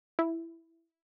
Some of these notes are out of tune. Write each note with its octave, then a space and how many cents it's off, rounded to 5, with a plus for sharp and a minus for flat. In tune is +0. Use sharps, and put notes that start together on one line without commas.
E4 +5